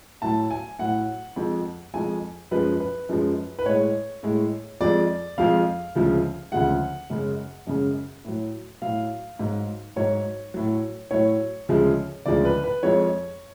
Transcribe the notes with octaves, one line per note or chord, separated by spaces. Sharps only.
A2 F#3 A5
G#5
A2 F#3 F#5
F2 F3 G#3
F2 F3 G#3 G#5
F#2 F3 G#3 B4
B4
F#2 F3 G#3
B4
A2 G#3 C#5
A2 G#3
F2 F3 G#3 D5
F2 F3 G#3 F5
D2 C#3 F3 G#3
D2 C#3 F3 G#3 F#5
F#2 C#3 G#3
F#2 C#3 G#3
A2 F#3
A2 F#3 F5
G#2 F#3
G#2 F#3 C#5
A2 F#3
A2 F#3 C#5
D2 C#3 F3 G#3
D2 C#3 F3 G#3 D5
B4
B4
F2 F3 G#3 C#5